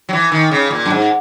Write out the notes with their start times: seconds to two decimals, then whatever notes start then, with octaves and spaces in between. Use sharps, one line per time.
0.09 F#3
0.13 E3
0.32 D#3
0.51 C#3
0.71 A#2
0.85 F#2
0.90 G#2